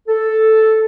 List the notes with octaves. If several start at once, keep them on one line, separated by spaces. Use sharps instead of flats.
A4